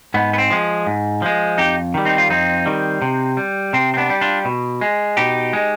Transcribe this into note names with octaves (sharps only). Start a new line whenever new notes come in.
G#2 B3
B3
C4
F3 G#3
G#2
F3 G#3
F2 D#4 G4
D#3 G3
C4 D#4
F4
F2 C4 D#4
D#3 G3
C3
G3
C3 C4
C4
B3 D4
G3
D4 F4
B2
G#3
B2 D#4 G4
G#3